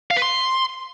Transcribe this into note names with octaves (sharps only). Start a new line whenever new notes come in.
F5
B4
C6